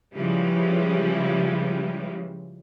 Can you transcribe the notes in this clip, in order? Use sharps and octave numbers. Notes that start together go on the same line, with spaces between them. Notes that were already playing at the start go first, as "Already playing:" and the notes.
C#3 E3 F3 G3 G#3